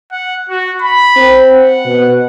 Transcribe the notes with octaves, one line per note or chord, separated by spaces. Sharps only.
F#5
F#4
B5
C4
F#5
B2